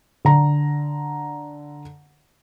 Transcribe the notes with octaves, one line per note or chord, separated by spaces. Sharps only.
D3 A#5